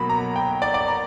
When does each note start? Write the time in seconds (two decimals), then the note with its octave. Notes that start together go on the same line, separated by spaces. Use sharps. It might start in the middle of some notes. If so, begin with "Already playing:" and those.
Already playing: B2 F#3 A#3 B5
0.10 A#5
0.36 G5
0.62 D5
0.74 D5
0.88 A#5